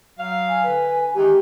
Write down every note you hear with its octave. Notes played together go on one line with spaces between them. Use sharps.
F#3 F5
G#5
D3 B4
G#5
D#3 E3 G#3 G4